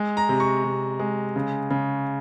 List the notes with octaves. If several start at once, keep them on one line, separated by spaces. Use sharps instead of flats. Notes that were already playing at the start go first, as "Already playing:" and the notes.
Already playing: G#3
A#5
C3
C#6
C3
G#3
C#3
C#3